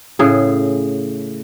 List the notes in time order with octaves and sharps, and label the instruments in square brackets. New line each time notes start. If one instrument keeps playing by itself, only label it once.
[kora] A2 C#3 G#4